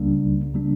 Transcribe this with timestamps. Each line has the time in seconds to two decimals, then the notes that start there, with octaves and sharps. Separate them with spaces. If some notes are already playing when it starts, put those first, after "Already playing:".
Already playing: C#2 C#3 G3 A#3 D4
0.54 C#3 G3 A#3 D4